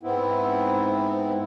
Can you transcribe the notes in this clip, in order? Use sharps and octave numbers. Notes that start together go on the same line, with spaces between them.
G#2 B3 C4 E4